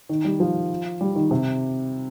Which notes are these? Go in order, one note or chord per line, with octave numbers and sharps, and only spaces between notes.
D#3
G3
F3
G3
D#3
C3